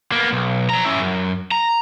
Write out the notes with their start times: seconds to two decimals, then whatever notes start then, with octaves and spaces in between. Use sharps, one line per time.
0.12 A#3 B3
0.32 B1
0.70 F3 A#5
0.85 C#4 E4
0.99 F#2
1.51 A#5